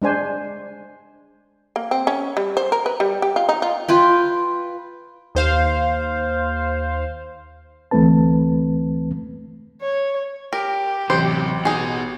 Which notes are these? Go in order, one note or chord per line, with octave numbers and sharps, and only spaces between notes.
G#3 D4 C5 G#5
A#3
C4
C#4
G3
C5
A#4
B4
G3
G4
F4
D#4
F4
F4 B4 G5
D#2 C5 F5
D2 E3 A3 C4 B4 A5
C#5
G4 A#4
A1 C3 F#3 C5
B3 D#4 F#4 G#4